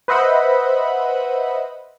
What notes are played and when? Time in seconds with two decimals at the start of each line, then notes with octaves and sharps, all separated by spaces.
0.08 B4 C5 D#5 E5 F#5 B5